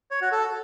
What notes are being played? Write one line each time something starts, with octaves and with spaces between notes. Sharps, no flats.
C#5
F#4
A4